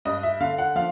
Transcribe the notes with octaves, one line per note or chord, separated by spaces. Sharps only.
G2 D#5
E5
D3 F5
F#5
F3 F5